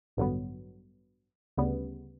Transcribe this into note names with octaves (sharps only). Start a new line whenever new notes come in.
A1 G2 D3 F#3 B3
D2 C#3 G3 B3